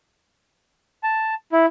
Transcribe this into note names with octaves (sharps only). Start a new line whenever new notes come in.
A5
E4